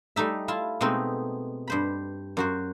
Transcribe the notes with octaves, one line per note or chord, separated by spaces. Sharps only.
G3 A3 D#4 E5
E4 F4 A5
B2 G#3 A3 C4 D#4
G2 C5 B5
F#2 F#4 C5